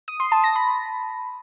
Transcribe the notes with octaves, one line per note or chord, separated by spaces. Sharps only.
D#6
C6
A5
A#6
B5